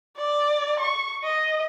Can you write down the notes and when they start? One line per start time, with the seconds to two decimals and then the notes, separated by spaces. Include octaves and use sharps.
0.16 D5
0.80 C#6
1.23 D#5